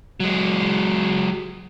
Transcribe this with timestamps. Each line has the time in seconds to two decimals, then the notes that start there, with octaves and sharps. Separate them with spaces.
0.20 F#3 G#3